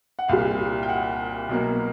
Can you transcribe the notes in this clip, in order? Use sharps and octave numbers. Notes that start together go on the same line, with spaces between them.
F#5
C2 A#2 G3 F5
G5
F#5
B2 F#3 A#3